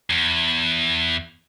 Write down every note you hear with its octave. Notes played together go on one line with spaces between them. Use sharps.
E2